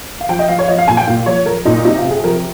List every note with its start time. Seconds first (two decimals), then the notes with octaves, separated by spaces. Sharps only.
0.20 F5
0.29 F3 G5
0.39 D#5
0.48 F3 F5
0.59 C#5
0.68 F3 D#5
0.78 F5
0.88 A#2 G#5
0.97 G5
1.07 A#2 F5
1.26 F3 C#5
1.46 F3 A#4
1.65 A#2 D#4
1.85 C3 D#4
1.98 F4
2.04 C3
2.11 G#4
2.24 F3 A#4